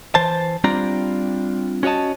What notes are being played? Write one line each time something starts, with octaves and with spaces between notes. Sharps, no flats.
E3 C5 A5
G3 C4 D4 F4 D5 A#5
C#4 F#4 C#5 D#5 A5